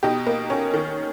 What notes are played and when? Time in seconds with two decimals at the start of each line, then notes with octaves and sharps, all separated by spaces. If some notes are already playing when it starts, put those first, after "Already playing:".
0.03 B2 D#4 G4
0.27 A#3
0.50 C#4
0.74 D#3